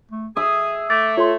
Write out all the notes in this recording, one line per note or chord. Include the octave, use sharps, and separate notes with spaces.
A3
G#4 E5 D#6
A3 D6 A6
F4 A4 C#5 C6